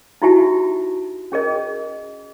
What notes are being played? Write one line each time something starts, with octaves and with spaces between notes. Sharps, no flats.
D#4 E4 F#4 G4 E5 A5
C#4 G#4 A#4 D#5